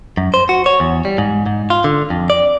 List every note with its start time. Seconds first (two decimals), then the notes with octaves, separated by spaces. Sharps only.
0.17 F#2
0.34 C5
0.49 F#4
0.66 C#5
0.80 E2
1.05 G3
1.18 G#2
1.46 G#2
1.70 F4
1.84 D3
2.10 F2
2.30 D5